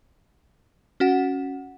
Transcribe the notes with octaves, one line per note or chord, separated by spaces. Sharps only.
C#4 F#4 F#5